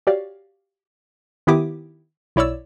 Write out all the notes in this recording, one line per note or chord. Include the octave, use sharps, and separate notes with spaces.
F#4 G4 C#5 D5 F5
D#3 B3 E4 G4 D6 D#6
B1 E4 C#5 D5 E6